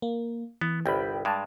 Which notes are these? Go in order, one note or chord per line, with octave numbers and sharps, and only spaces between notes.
A#3
E3 B3
G1 C2 G5 B5
G2 G#3 A5 D6